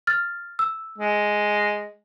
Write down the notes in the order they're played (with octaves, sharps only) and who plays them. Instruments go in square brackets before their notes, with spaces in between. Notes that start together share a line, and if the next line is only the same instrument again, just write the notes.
[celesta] F6 A6
E6
[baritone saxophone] G#3